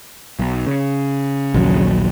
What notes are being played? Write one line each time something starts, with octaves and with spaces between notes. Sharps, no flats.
B1
C#3
A#1 D#2 F#3